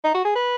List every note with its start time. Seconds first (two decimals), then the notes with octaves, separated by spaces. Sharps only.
0.04 D#4
0.14 F#4
0.24 G#4
0.35 B4